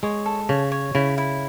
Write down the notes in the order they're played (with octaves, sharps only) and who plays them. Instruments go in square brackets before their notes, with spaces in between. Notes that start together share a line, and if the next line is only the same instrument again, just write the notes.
[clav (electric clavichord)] G#3 [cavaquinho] C#5
[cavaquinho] A4
[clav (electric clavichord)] C#3 [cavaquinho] C#5
[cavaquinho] C#5
[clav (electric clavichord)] C#3 [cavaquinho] E4
[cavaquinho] E4